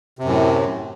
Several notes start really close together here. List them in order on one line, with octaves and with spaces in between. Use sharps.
C3 F#2 A2